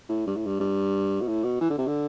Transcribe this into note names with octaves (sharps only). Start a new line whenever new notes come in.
A2
G2
A2
G2
G2
B2
A2
B2
E3
D3
C3
D3